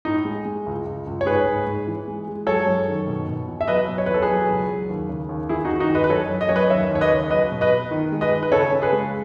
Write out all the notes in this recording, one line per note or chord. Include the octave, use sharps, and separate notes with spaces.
A2 D#4
G#3
G#3
C#2
C#2
C#2
C#5
G#2 G#4 B4
G#2
G#2
E3
G#3
G#3
F#3 A4 C#5
F#2
D#3
B2
B2
E2
E5
F#3 B4 D#5
B2
C#5
E2 B4
A4
G#4 B4
F#3
C#2
F#3
D#2
C#3
D#2
E2 E4 G#4
D#4 F#4
D#3
D#4 F#4
E2 B4 D#5
B4
F#2 A4 C#5
F#2
D#5
F#2 C#5
B4 D#5
D#2 C#5 E5
D#2 C#5
B4 D#5
C#3
F#3 B4 D#5
B2
B4 D#5
B2
D#3
G#3
B4 D#5
D#3
B4
C#3 A4 C#5
C#3
G#4 B4
G#3